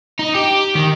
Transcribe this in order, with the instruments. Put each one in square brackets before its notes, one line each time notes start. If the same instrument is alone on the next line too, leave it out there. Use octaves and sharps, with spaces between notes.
[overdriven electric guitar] D#4
G4
D#3